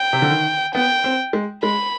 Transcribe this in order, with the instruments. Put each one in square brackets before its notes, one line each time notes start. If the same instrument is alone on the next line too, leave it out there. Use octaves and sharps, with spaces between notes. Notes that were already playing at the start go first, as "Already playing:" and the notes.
Already playing: [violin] G5
[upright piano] C3
D3
D#3
[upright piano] B3 [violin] G5
[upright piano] C4
G#3
[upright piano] G#3 [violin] B5